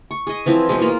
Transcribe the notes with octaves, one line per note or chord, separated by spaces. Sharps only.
C#6
G#4 D#5
E3 F3 C4
B2 G#3
A#3 F4